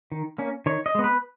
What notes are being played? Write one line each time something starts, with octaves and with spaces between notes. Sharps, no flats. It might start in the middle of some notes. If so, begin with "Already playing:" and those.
D#3
A#3 C#4
D#3 C#5
D#5
G#3 B3
B4